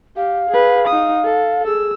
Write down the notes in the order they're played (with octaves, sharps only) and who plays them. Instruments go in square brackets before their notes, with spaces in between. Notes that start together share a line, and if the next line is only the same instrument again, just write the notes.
[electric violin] G4 [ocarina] F5
[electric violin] G#4 B4
D#4 D#6
A4
[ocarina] G#4 [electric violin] E6